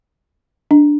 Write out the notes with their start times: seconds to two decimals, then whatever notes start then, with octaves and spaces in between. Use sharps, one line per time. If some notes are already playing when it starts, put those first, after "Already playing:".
0.71 D4